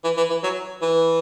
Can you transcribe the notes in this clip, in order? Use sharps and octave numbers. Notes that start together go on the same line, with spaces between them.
E3
E3
E3
F#3
E3